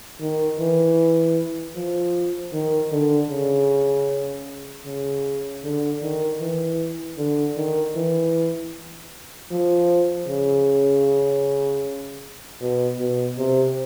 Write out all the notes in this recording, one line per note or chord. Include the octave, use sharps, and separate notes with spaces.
D#3
E3
F3
D#3
D3
C#3
C#3
D3
D#3
E3
D3
D#3
E3
F3
C#3
B2
B2
C3